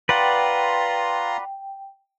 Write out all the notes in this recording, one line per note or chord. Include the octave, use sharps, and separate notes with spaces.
F4 B4 D5 F#5 G5 A#5 C6